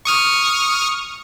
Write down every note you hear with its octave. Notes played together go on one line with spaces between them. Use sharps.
C#6 D#6 F6